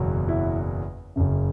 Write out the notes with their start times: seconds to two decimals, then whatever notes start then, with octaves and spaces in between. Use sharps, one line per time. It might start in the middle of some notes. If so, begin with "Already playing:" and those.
Already playing: F#1 E2 B2 F#3
0.29 E4
1.16 F#1 F#2 C#3